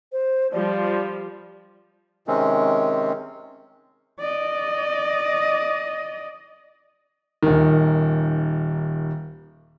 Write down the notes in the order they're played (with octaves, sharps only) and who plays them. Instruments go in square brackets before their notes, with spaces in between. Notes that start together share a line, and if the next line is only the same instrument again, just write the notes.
[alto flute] C5
[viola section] F3 G3 [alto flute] D5
[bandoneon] C3 D#3 G#3 C4 C#4
[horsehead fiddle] D5 D#5
[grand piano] D#1 D#3